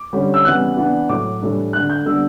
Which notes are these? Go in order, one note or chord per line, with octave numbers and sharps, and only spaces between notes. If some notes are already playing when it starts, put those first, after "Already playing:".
Already playing: D6
D3 G3 C#4
E6
C#3 E3 G3 B3 F#6
E3 B3 D4
A2 F#3 A3 D6
A2 E3 G3 D4
D3 A3 D4 F#6
G6
D3 G3 B3 D4 E6